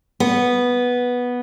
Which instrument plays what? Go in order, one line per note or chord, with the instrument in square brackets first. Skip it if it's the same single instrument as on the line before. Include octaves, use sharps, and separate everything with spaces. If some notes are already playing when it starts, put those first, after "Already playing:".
[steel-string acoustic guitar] B3